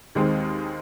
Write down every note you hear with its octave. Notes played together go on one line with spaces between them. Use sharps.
D#2 D#3 G#3 C4